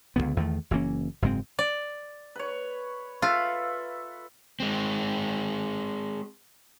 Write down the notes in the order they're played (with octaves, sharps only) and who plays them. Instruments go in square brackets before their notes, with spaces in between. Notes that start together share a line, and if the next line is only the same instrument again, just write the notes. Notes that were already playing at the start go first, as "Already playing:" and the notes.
[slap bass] C#2 G2 D3 B3
E2 D#3 F3 A3
F#1 E3 A#3 C#4
F#1 G#2 G#3 C4
[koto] D5
[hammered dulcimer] B4 C#5
[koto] F4 [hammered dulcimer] A4 B4 E5
[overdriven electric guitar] G#3 C4